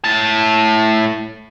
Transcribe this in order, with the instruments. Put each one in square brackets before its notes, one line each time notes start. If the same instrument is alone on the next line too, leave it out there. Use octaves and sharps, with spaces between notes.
[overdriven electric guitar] A2 A5